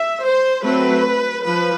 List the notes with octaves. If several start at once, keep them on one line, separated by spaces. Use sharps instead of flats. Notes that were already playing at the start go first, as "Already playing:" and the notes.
Already playing: E5
C5
F#3 A3 C4 B4
F3 B4